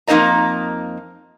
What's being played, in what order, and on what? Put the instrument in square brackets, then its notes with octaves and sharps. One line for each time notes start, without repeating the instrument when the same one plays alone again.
[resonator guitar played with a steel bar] F2 A#3 D#4 C5 D#5 A#5